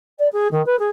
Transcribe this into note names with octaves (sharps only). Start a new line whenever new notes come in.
D5
G#4
D#3
B4
G#4